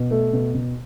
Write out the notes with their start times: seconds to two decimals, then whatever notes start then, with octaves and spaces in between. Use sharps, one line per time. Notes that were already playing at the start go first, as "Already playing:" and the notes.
Already playing: B2
0.11 A3
0.33 B2
0.54 B2